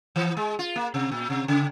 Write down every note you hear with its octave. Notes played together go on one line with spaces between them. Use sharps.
E3
G#3
F4
A#3
C3
A#2
C3
C#3